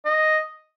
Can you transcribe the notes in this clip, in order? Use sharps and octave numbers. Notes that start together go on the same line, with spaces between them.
D#5